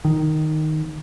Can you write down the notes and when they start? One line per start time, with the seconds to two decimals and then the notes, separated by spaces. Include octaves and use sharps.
0.05 D#3